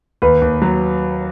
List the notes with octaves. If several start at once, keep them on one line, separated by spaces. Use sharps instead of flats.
D#2 B4
D#2
F#3